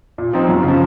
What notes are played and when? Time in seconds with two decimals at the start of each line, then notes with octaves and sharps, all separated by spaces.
0.18 A#2
0.33 F3 C4 D#4
0.49 F#2
0.63 C#3
0.68 F3